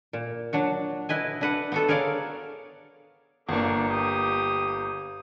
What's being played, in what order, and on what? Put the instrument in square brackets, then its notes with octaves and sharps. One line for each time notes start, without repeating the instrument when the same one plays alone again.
[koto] A#2
F#3 D4 F#4
E4 B4 D#5 G#5
D4 B4 F#5
B3 F#4 A4
G#4 A#4 C#5 D5 F5
[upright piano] G1 A#3 [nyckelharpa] D4 C#5
[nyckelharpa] G4 D#6